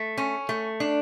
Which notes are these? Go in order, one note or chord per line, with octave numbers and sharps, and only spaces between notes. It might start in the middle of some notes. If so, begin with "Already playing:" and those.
Already playing: A3
C#4
A3
D4